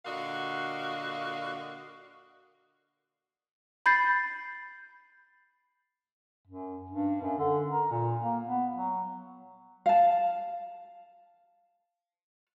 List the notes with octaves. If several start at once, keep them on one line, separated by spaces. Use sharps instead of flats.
A#2 D3 F#4 D#5 F5
B5 G6 A6 C7
F#2
G2
F#2
D3
A#4
A#2
A#3
B3
F#3
F5 A5